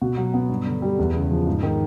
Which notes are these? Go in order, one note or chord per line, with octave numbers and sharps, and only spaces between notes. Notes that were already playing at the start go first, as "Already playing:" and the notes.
B2 F#4
F#3
B3
G2
D3
G3
E2
C#3
F3
G#2
D#3